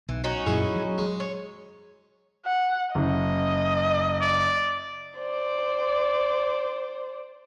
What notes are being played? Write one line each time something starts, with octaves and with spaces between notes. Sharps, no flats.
B1 E3
C#4 D#4 F#4
F#2 A#2 F#3 E4 G#4
F#3
G#3
C#5
F#5
F#1 D#5
D5
C5 D5